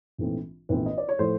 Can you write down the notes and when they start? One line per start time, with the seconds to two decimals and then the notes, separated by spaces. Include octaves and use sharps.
0.18 A#1 G#2 E3 A3 C4
0.69 A#1 G#2 E3 A3 C4 B4
0.86 D#5
0.98 D5
1.09 C#5
1.19 A2 F3 A3 C5